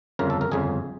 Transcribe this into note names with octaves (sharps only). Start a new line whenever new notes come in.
G1 F2 C#3 A#4
A4
A#4
G1 F2 C#3 G#4